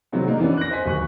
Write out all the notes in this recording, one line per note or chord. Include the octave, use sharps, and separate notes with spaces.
C3 D#3 F#3 G#3 B3 C4
A#3 D4 D#4
E3 B3 C#4 D4
F#6 A#6
C5 D#5 G#5 B6
D1 D#2 G#5 C#6 F#6